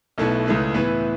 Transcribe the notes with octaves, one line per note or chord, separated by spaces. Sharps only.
B1 B2 A3 E4 B4
C#2 C#3 A3 E4 B4
A2 E3 B3 E4 B4